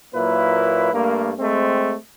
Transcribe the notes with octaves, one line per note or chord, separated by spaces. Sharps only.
A#2 F#3 A#3 E4 B4
G2 A3 A#3
G#3 A3 C4